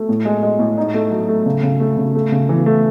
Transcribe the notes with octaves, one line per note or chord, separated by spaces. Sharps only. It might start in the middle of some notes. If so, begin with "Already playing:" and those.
Already playing: A3
A2
G#3
G#3
A2
D#4
A3
F#3
A3
C#3
C#3
A3
C#3
A3
C#3
E3
A3